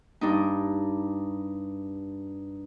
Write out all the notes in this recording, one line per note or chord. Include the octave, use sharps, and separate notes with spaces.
G2 D4 D#4